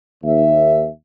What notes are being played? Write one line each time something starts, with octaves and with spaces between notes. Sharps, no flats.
D#2 E5